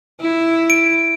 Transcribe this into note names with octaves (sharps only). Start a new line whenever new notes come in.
E4
D7